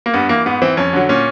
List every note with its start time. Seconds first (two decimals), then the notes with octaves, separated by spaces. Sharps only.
0.06 A#3
0.14 G2 B3
0.29 E3 A#3
0.46 G#2 B3
0.62 E3 C4
0.77 F2 C#4
0.93 D3 F#3
1.09 A#2 C#4